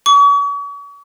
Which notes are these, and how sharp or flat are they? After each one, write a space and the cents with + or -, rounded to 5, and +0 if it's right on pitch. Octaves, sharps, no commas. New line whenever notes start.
C#6 +40